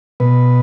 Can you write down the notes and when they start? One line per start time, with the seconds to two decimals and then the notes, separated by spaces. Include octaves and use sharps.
0.20 B2 B4